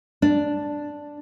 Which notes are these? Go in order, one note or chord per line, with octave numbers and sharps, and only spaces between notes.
D4